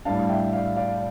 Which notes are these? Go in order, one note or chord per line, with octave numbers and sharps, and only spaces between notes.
A2 G3 D4 F5 A5
E5 G5
D5 F5
D5 F5